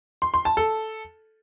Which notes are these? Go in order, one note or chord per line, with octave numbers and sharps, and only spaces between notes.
C6
C6
A5
A4